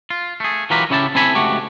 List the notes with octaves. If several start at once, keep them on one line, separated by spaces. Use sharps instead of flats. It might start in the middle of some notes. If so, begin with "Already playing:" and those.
F4
A3 G#4
E3 F#3 F4 G4 A#4 B4
C#3 C#4 E4 G4 G#5 A5
C4 E4 A4 G#5 B5
C#2 A3 F#4 G4